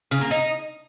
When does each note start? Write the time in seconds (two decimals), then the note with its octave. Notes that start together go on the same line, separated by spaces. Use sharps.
0.11 C#3
0.21 A#3
0.31 D#4